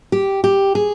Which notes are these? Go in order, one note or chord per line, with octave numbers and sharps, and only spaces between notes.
G4
G4
G#4